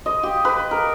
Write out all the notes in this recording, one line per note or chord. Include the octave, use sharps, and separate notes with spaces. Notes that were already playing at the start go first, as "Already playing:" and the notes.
D#5
G4
B4
A#4